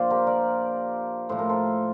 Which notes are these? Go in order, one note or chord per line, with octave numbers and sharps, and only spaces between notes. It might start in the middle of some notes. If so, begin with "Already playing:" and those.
Already playing: A#2 F3 D4 F4 C5 D5
G4 A#4
A#4 D5
A2 F3 C5
A#4
A4 C5